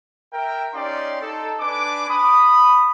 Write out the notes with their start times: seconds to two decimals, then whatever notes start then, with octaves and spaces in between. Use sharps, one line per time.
0.33 A#4 E5 G5
0.74 C#4 D#4 G4 D5 F5 C6
1.22 D#4 A4
1.60 D4 B4 G#5 D6
2.09 B5 D#6